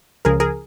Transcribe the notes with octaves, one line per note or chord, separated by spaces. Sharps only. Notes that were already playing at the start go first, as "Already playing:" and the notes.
C#2 C#3 F3 G#4 A#4
G#4 A#4